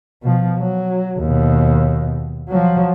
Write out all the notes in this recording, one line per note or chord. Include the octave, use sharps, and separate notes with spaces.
B2 F3
F#3
D#2 B2
F3 F#3